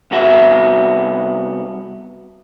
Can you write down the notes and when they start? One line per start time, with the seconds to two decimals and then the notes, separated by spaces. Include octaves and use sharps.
0.11 C2 B3 F#4 E5